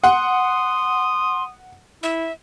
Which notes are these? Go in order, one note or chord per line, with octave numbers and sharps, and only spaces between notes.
F#5 C6 D#6
E4 E5